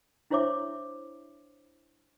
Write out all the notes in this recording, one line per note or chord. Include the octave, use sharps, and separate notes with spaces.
D4 E4 C5 C#5 E5 D6